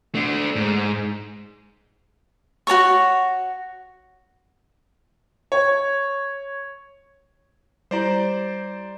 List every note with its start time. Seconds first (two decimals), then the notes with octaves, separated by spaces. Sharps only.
0.15 A3 D4
0.56 G#2
2.67 F#4 A4 C#5 C#6
5.52 C#5
7.91 G3 E4 G4 C5 D5 A#5